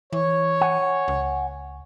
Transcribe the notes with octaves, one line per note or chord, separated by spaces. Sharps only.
E3 C#5
F#5 G#5
C#2